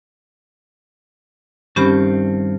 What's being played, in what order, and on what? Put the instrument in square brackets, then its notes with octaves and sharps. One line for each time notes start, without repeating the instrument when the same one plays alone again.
[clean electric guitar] G2 D#3 C4 [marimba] C#4 G4 B5